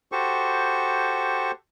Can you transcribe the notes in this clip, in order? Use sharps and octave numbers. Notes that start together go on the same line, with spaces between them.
F#4 G4 A4 C5 C#6